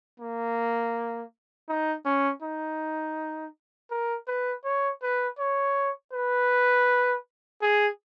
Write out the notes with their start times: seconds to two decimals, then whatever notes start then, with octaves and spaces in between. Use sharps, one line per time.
0.20 A#3
1.69 D#4
2.06 C#4
2.43 D#4
3.91 A#4
4.28 B4
4.65 C#5
5.02 B4
5.39 C#5
6.13 B4
7.62 G#4